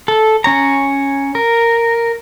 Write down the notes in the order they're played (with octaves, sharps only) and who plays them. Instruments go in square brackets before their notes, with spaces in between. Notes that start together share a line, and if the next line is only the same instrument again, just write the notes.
[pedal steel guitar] A4
C#4 C#5 A#5
A#4